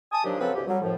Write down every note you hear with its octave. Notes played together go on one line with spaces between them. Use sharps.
G#5 A5 D#6
A#2 D#3 F3 F#3 D4 G4
C#3 F3 F#3 C4 A4 B4
D2 A2 C#3 G4
F#3 G3
F#2 A2 F3